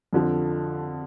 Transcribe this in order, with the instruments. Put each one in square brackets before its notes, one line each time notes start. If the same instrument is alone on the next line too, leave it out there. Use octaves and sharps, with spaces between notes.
[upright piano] F2 D3 F3